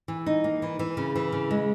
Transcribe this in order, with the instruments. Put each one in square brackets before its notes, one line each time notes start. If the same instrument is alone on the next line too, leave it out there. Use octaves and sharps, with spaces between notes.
[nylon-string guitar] E3
D#4
A#3
E3
E3
C#3
E3
C#3
G#3